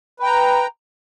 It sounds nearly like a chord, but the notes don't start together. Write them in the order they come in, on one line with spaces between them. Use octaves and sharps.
B4 G5 A#5